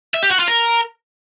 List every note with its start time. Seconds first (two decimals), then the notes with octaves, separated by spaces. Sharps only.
0.14 E5
0.22 G4
0.31 F#4
0.39 F4
0.48 A#4